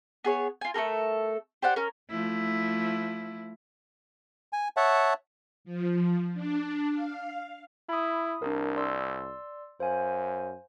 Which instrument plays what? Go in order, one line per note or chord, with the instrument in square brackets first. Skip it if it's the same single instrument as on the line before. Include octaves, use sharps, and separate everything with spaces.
[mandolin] B3 G#4 C#5
F4 G#5
A3 G4 A4 A#4
G4 C5 D5 F#5
C#4 A#4
[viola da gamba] F3 A3 E4
[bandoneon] G#5
C#5 E5 F#5 A5
[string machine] F3
D4
F5
[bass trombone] E4 [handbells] B5 D#6
[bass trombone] C2 [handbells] D4 A#4
[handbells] D5 C6 E6
[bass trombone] F#2 [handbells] C5 F5 G#5